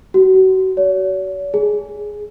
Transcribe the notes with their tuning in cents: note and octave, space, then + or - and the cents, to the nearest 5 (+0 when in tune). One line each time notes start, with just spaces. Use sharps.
F#4 +35
C#5 +45
G#4 +0